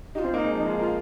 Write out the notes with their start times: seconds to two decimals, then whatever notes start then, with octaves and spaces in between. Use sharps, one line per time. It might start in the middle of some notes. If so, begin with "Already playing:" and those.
0.15 D#4 G4
0.19 F4
0.24 C4
0.34 A#3 D#4
0.43 G#3
0.53 F3 D#4
0.66 G#3 F4
0.79 F4 A#4